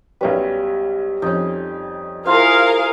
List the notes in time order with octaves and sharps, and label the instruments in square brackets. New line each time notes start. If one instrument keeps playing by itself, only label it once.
[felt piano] B1 C#4 B4 [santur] G3
[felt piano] F2 C#4 [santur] D#4
[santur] E4 F4 C5 [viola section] G#4 A#4 F5